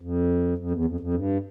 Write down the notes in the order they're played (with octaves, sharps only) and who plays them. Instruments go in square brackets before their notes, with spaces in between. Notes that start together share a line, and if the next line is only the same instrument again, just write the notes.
[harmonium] F2
F2
E2
F2
F2
G2